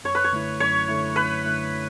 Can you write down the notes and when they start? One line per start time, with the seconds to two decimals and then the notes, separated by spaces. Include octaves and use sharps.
0.04 F#2 C#5
0.15 B4
0.24 C#5
0.32 D3 A3 E4
0.60 F#2 C#5
0.88 D3 A3 E4
1.16 F#2 B4
1.44 D3 A3 E4